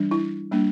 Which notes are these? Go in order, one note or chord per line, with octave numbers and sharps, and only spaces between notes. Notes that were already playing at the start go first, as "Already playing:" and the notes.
Already playing: E3 G3 D4
E4
G3 A#3 D4